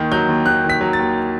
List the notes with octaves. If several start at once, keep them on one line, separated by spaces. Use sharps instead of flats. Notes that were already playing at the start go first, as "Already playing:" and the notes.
Already playing: D#2 D#3
F#3 G6
D#2
D#2 F#6
D#3
B6
F#3
A6
D#2